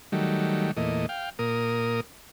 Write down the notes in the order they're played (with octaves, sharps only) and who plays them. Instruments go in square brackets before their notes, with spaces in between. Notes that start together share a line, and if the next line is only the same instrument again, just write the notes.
[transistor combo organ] D#3 F#3 G3 A3
E2 A#2 A3 D#5
F5 G5
A#2 A#4 D#6